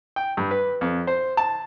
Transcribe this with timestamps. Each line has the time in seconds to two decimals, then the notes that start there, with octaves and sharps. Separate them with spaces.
0.16 G5
0.37 G2
0.51 B4
0.81 F2
1.07 C5
1.37 A5